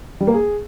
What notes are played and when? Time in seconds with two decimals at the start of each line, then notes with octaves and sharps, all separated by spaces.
0.20 G3
0.27 A#3
0.34 G#4